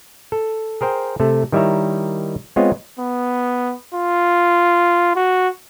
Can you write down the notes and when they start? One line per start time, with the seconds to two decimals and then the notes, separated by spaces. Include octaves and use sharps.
0.32 A4
0.81 G#4 A#4 C5 G5
1.20 C3 A3 A4
1.52 D#3 G3 E4 C#5 E5 A#5
2.56 G#3 B3 C4 F4 C#5 D#5
2.99 B3
3.94 F4
5.16 F#4